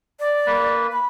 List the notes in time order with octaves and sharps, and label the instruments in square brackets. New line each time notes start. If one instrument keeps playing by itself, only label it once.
[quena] D5
[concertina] A#3 B4
[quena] B5